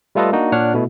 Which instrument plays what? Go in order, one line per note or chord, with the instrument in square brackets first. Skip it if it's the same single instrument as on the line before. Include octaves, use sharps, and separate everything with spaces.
[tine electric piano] G3 A3 F4 A4 B4 D#5
A#3 D4 D#4 F#4
A#2 D4 C#5 F#5 F6
B2 A3 E4